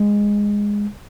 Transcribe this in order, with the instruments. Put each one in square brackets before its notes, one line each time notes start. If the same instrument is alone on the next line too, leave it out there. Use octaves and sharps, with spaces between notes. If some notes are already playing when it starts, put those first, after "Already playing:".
Already playing: [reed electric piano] G#3